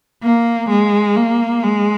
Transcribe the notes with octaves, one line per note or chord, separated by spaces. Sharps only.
A#3
G#3
A#3
G#3